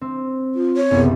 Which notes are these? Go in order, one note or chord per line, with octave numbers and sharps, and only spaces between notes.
C4
F4
C#5
F#1 C2 B3